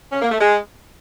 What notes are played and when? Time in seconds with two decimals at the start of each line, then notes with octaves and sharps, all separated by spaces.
0.12 C#4
0.21 A#3
0.31 A3
0.41 G#3